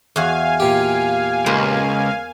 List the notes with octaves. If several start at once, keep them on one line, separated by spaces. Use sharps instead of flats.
E2 F#4 F5 G#5
A#2 G4
C#2 A#3 C5